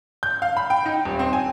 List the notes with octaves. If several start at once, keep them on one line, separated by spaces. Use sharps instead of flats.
G6
F5
B5
G5
D#4
D#1
C4
G#5